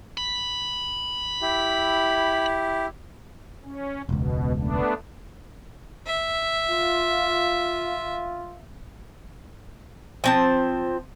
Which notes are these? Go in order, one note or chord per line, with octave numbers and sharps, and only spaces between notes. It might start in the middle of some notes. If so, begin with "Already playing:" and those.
B5
E4 G4
C#4
E1 C#2 B2
A3 B3 D4
E5
F4
F3 C4 A5